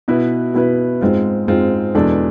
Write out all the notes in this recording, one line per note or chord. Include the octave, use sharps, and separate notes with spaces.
B2 B3 E4 B4
B2 B3 E4 B4
G#2 G#3 C4 F4
G#2 G#3 C4 F4
E2 B2 G#3 D4 A4